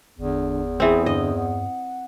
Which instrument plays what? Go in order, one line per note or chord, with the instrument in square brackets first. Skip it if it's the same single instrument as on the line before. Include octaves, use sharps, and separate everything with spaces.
[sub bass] G1 [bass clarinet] E2 [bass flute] D3
[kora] E3 C4 [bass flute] G#4
[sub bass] G2 [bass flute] D3 [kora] D#5
[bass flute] F#5